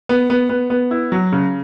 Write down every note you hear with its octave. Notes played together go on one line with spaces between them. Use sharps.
B3
B3
B3
B3
E4
F#3
C#3